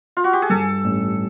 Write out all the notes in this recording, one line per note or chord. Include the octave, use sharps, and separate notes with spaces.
F4
F#4
G4
G#4
G2 A4
A1